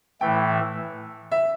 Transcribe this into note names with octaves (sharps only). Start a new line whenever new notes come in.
A2 E3 A3 G5
E5